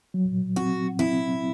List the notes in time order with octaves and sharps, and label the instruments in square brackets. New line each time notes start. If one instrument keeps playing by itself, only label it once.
[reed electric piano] F#3
[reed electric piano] C4 [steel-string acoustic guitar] F#4
[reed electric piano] C4 [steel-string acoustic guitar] E4